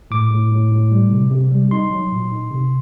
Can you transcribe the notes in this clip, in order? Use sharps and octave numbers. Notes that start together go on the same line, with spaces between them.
A2 D6
A2
A2
A2
G3
C3
C3
G3
D#4 C6
F#3
A#2
D#4
C3